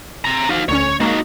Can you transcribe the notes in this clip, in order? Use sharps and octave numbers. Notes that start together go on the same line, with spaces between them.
C4 A#5
F3 D#4 F#4 F5
D2 D3 C#4 C#5
G#3 A#3 D#4 F#4